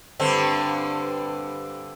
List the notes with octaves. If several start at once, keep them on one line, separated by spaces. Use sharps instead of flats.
G2 D3 C4